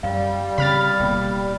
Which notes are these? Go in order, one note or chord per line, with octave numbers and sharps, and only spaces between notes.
F#2 G3 F5
C#3 C4 B5 F6 A6
D1 B2 A#3